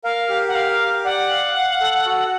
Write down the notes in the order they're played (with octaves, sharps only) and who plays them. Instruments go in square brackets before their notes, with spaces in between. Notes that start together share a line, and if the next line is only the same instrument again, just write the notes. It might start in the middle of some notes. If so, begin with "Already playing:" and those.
[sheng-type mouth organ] A#4 [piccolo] F5
[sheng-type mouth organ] G4
[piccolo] F#5
[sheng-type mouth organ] A#4 [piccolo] F5
[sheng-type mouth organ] G4
[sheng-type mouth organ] D5 [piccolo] F#5
[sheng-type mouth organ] F5
F5
A4
F#4